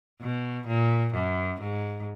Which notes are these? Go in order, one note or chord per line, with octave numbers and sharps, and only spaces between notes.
B2
A#2
F#2
G#2